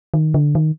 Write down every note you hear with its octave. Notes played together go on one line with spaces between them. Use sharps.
D#3
D3
D#3